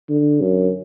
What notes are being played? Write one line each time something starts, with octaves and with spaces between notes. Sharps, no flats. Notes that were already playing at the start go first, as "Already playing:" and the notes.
D3
F#2